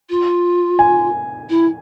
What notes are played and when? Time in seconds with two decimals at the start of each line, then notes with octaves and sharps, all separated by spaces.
0.09 F4
0.79 G#5
1.49 E4